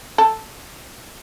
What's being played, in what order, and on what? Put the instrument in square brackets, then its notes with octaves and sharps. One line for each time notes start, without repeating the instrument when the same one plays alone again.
[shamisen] A4